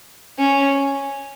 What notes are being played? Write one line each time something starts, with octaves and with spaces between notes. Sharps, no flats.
C#4